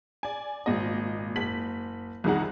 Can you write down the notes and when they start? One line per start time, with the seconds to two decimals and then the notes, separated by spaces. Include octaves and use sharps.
0.23 D5 G#5
0.66 G#1 A#2 D#5
1.36 F#1 B6 F#7
2.24 C2 F2 D#3 D#4 G#4 F#5